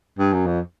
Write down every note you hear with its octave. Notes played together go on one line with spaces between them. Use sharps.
G2
F#2
F2